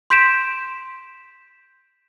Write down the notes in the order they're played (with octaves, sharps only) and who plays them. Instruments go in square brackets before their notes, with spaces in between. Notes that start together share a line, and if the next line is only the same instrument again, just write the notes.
[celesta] C6 G6 B6 D7 E7